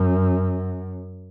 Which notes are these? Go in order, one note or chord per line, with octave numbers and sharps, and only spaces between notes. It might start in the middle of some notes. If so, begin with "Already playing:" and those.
Already playing: F#2